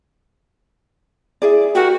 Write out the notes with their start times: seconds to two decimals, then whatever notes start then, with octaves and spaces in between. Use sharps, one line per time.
1.42 E4 G#4 D5
1.75 F#4 G4 A#4